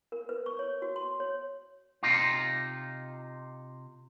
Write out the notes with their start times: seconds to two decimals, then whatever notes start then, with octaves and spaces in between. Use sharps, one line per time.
0.12 A#4
0.29 B4
0.46 C#6
0.59 C#5
0.82 F#4
0.96 C6
1.20 C#5
2.03 C3 D#4 F4